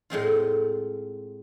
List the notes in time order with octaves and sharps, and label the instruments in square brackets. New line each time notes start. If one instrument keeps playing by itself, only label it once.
[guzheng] A2 G#3 C4 F4